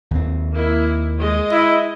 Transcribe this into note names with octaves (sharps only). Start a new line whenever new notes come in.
D#2 C4
A#3 E4
G#3 D#5
E4